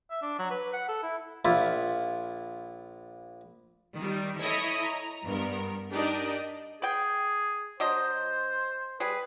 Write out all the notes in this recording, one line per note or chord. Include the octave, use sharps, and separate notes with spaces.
E5
D4
F#3
B4
F#5
A4
E4
A#1 E4 F4
D#3 G3
E4 A4 C#5 D#5 D#6
A#5
G2 B3 A#4
D4 D#4 G4 A#4 D5 D#5
G#4 B4 G5
F#3 D4 C5 D#5
G3 G#4 B4